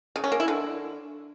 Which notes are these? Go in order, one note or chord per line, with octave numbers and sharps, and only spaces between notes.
C#3
C#4
A#3
E4
D3